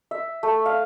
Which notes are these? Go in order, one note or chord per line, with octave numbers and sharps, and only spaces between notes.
E5
A3
F5